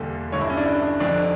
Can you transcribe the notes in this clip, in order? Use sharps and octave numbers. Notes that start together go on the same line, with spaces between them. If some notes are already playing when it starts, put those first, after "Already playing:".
Already playing: E1 D2 D3 G3 A#3 A4
G1 G2 D3 C#5
E4
C#4
D4
E4
D4
F1 F2 D3 D4